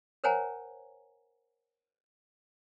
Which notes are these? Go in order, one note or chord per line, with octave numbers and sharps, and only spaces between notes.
A#4 C5 C#5 F#5 G#5 A#5